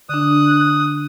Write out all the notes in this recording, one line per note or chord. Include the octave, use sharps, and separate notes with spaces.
D3 D4 D#6 F#6